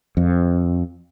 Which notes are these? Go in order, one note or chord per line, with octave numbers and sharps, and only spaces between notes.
F2